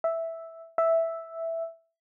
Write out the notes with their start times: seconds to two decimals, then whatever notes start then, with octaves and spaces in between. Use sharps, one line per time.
0.04 E5
0.78 E5